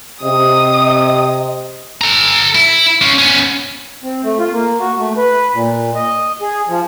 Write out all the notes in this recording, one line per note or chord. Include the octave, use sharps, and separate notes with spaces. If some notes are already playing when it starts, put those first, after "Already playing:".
C3 D#5 D#6
A4 A#5
E4
C#4 F4
B3 C#4
C4
A3
F4
A#3
F#4
A3
B4
A#2
D#5
G#4
F3